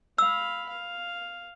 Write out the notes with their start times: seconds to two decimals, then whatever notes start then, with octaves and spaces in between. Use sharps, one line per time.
0.18 F5 B5 E6
0.69 F5